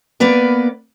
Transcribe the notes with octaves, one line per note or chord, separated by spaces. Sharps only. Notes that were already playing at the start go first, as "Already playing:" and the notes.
A#3 B3 B4 D5